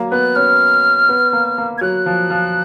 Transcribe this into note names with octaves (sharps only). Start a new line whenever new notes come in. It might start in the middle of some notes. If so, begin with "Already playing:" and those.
Already playing: F#3 A#3
B3 F#6
C#4 F6
B3
A#3
A#3
G#6
F#3 F#6
F3
F3